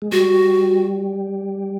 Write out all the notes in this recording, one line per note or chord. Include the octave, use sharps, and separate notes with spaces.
G#3
G3 F#4